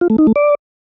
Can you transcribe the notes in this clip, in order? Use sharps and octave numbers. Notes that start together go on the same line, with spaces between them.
F4
A3
D#4
A3
D5